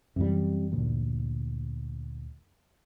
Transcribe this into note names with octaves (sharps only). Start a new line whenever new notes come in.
F#2 C3 E3 G3
D2 A#2